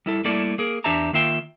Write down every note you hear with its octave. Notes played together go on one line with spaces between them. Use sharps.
G3 E4 A4
G3 A3 A#3 E4 A4 D5
A#3 G#4 A#4
E2 D4 G4 E5 A5 A#5
D#3 A#3 F4 E5 G5